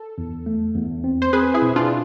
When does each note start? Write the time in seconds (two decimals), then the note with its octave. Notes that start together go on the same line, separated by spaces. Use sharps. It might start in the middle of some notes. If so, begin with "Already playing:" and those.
Already playing: A4
0.18 E2
0.46 A3
0.75 E2
1.04 C4
1.22 C5
1.33 C4 G#4 B4
1.54 E4 G#4
1.62 B2
1.76 D4 F4